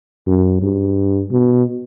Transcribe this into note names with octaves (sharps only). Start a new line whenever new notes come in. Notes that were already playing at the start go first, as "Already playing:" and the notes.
F#2
G2
B2